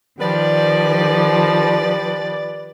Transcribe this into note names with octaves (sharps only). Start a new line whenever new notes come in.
D#3 F3 G3 B4 D5